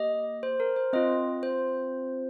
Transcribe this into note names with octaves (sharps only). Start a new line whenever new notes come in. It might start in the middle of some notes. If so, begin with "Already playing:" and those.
Already playing: A#3 G4 D#5
C5
A#4
C5
C4 F4 D#5
C5